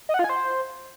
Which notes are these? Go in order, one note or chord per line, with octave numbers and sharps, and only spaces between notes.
D#5
F#5
F4
G#5
C5